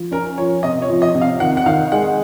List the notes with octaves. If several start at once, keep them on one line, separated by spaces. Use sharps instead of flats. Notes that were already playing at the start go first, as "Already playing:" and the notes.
Already playing: F3
C#4 A#4
F3 C#5
C3 D#5
C#5
F3
D#5
C3
F5
D#3 F#5
F#5
D#3 F5
G#3 F#5